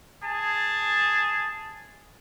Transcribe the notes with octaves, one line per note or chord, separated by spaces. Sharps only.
G#4 A5